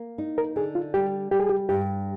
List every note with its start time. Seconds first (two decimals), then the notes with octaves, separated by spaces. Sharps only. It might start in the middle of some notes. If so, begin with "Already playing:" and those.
Already playing: A#3
0.18 D#4
0.38 A#4
0.56 D3 G#4
0.75 F4
0.94 G3 G4
1.31 G3 G4
1.40 G#4
1.49 G4
1.69 G2 G4